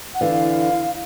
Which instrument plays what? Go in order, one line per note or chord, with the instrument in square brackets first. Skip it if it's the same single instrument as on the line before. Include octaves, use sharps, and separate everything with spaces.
[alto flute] F#5
[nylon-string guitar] D3 E3 [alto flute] F5